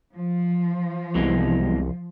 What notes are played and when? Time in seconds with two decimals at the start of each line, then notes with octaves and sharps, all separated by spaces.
0.14 F3
1.15 C2 B2 E3 G#3